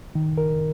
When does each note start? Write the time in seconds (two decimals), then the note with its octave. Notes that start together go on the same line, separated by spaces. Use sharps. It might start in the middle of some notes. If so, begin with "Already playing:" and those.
0.15 D#3
0.38 A#4